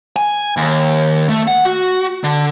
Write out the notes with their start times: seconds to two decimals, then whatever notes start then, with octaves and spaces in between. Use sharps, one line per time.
0.16 G#5
0.57 D#2
1.29 A3
1.48 F#5
1.65 F#4
2.24 D3